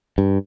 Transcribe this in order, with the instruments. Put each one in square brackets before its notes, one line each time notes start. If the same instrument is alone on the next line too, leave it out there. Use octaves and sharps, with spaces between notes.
[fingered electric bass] G2